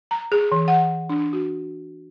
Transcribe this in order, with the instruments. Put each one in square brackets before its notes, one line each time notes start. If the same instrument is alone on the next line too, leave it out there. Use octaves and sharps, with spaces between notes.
[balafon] A#5
G#4
E3
F#5
D4
F#4